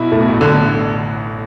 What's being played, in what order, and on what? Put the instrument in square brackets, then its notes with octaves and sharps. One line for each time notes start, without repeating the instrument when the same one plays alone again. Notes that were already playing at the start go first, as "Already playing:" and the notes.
Already playing: [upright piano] B1 B2 [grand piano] E4
[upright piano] A2 [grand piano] A3
[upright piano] B2
A1 A2
[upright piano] A1 A2 [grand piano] D3